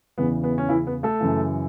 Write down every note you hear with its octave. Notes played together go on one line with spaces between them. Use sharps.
E2 C#3 E3 B3
B3
C#4
E3 E4
B3
A3 A4
F#2 C#3 E3